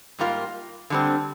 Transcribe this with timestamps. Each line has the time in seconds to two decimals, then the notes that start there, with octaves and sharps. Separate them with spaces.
0.19 G#2 G3 A#3 F4 A#4
0.90 D3 G3 C4